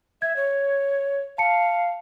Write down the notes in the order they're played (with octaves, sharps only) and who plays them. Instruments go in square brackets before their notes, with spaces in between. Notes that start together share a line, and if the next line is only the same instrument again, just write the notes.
[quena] E5 [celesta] G#6
[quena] C#5
[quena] F5 [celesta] A5 C#7